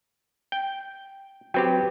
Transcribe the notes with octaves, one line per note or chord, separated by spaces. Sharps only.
G5
F#3 C4 G4 B4 G5